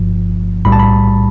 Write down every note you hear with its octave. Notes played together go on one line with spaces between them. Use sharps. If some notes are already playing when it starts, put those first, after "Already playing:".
Already playing: G1 G2 F3
B1 A2 G3 B5
A5
B5